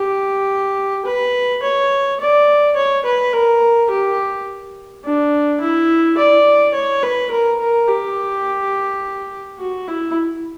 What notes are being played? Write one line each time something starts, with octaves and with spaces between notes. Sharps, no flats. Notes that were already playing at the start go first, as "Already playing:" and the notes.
Already playing: G4
B4
C#5
D5
C#5
B4
A#4
G4
D4
E4
D5
C#5
B4
A#4
A#4
G4
F#4
E4